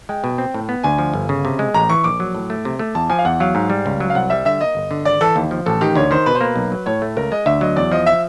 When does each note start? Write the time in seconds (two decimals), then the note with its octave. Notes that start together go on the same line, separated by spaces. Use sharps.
0.09 G#3 G5
0.24 B2
0.38 C4
0.54 A2
0.69 B3
0.83 D2 G#5
0.98 F3
1.14 G1
1.29 C#3
1.45 C3
1.59 G#3
1.74 A1 A#5
1.89 E3 C#6
2.04 A#1 D6
2.20 F#3
2.35 A2
2.50 A3
2.65 C3
2.79 A3
2.95 E2 A5
3.10 F3 G#5
3.19 F5
3.25 E2 F#5
3.40 F#3 F5
3.55 G#2
3.70 G3
3.86 C#2
4.00 F#3
4.10 F5
4.15 C2 F#5
4.30 G3 E5
4.45 D3 E5
4.60 A#3 D#5
4.75 G1
4.91 D3
5.05 G#1 D5
5.21 E3 A4
5.36 D#2
5.51 F3
5.66 A1 A4
5.81 D#3 G4
5.95 D2 C#5
6.11 D#3 C5
6.26 B2 B4
6.35 C5
6.41 A#3 B4
6.56 B1
6.72 F#3
6.86 A2 C#5
7.02 A3
7.17 C#2 A#4
7.32 G#3 D#5
7.46 D2 E5
7.61 F#3 D#5
7.76 E2 D5
7.92 F3 D#5
8.06 E5